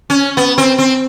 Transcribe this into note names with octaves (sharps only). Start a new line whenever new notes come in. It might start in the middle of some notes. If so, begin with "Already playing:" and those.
C#4
B3
C4
C4